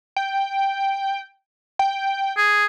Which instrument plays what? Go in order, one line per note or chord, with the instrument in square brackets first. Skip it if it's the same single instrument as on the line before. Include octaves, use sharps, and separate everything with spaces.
[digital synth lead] G5
G5
[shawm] G#4